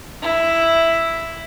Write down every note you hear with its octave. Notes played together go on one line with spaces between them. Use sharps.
E4